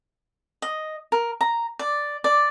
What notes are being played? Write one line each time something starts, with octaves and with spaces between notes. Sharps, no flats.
D#5
A#4
A#5
D5
D5